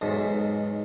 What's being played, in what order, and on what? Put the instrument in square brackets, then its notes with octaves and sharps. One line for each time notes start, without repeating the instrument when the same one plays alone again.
[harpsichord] B1 E2 G#2